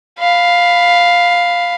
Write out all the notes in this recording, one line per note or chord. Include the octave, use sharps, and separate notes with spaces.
F5 B5